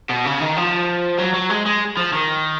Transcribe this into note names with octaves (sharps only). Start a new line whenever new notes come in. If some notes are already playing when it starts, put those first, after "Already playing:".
B2
C#3
D#3
F3
F#3
F#3
G#3
G#3
F3
D#3